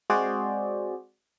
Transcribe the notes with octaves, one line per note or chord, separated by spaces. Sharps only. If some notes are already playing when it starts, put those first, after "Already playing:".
G#3 C4 F#4 G#4 C5 D5